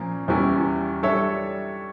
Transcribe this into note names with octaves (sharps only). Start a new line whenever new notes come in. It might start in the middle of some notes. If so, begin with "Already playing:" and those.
Already playing: A#2 F3 A#3 C#4
E2 E3 G3 C#4 E4
G3 D4 A4 C#5 E5